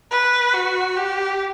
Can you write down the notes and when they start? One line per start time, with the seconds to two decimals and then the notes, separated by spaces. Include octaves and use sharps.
0.11 B4
0.54 F#4
0.97 G4